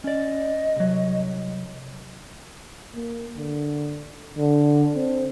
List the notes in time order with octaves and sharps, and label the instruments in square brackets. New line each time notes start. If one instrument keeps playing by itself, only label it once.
[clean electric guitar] C#4 D5 [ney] D#5
[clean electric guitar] C2 F#3
[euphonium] A#3
D3
D3
C4